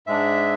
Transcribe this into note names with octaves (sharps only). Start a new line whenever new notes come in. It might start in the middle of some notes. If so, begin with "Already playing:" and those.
G#2 G#3 D4 E5